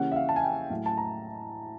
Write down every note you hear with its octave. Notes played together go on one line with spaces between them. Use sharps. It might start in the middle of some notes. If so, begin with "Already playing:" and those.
Already playing: C#3 E3 G3 A#3 C#4 F#5
E5
F5
A5
G#5
G5
A2 F#3 A3
A5
A#5